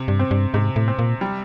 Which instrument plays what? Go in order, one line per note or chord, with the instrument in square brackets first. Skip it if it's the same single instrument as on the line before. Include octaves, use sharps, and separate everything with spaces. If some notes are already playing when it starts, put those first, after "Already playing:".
Already playing: [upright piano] C3
[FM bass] G2
[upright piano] C4
[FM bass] G2
[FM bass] G#2 [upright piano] C3
[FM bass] A2
[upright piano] C4
[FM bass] A#2
[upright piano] G3